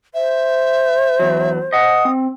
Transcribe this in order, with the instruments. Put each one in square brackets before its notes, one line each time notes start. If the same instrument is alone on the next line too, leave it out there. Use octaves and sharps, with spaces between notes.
[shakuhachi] C5 [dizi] E5
[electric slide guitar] E2 F#3
[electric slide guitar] D#5 F#5 [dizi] D#6
[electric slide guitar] C4